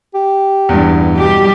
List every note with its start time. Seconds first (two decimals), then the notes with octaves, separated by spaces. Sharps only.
0.14 G4
0.69 E2 G2
1.14 B2 G3 G4